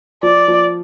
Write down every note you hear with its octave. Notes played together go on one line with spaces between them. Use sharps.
F3 D5
F3